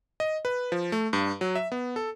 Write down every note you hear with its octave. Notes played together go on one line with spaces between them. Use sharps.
D#5
B4
F3
A3
G2
F#3
E5
B3
A4